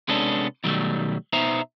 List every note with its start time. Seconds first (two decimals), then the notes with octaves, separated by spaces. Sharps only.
0.08 C3 G#3 B3 C#4 D4 A4
0.64 B2 D#3 F#3 G3 A3
1.33 B2 B3 D#4 C5 E5 A#5